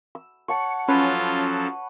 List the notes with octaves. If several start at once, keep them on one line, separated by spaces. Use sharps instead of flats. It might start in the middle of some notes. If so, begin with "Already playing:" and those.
E6
C#5 F#5 A5 C#7
F3 F#3 C#4 F4 A4 B4